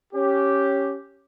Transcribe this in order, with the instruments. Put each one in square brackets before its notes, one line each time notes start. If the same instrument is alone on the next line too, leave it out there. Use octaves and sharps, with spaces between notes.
[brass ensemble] C#4 G4